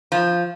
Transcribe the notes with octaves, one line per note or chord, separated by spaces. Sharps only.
F3